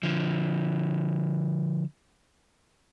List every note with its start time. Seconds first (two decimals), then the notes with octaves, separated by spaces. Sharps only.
0.03 D3 F3